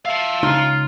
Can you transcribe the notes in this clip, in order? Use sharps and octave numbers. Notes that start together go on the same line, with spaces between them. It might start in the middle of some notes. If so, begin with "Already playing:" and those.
E5 F5 A5
C#2 D#4 F4 C6